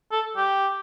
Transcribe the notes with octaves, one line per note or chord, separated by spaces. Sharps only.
A4
G4